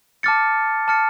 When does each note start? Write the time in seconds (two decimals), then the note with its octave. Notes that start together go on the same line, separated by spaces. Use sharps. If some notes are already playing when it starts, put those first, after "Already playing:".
0.23 A5 D6 F6 A6 C#7
0.88 A5 D6 F6 A6 C#7